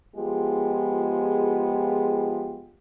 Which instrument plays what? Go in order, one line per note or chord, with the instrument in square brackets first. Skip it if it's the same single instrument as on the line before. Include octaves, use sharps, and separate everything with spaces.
[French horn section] F3 G#3 B3 F4 G4 G#4